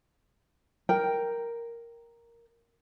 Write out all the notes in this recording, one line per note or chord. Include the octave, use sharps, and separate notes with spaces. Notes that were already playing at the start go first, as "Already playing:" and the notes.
A#4 G5